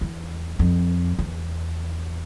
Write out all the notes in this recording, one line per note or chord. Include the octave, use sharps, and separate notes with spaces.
E2
F2
E2